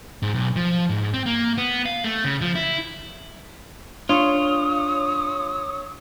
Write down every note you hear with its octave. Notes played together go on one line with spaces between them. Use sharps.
G#2
B1
F3
G#2
C4
A#3
B3
F5
A3
C#3
F3
E4
D4 F4 C#5 D#6